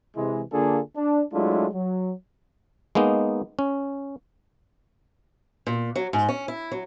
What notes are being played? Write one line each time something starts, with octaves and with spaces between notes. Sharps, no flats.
C3 E3 G#3
D3 A#3 D4 F4 G#4 A4
D4
F#3 G#3 A3 D4 E4 F4
F#3
G#3 A#3 B3 D#4
C#4
A#2
F#3
G#2
C#4
E4
F#3